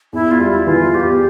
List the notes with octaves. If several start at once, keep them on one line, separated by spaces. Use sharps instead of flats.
E2 E4
F4
G3
E4
E3 F4
E2 G4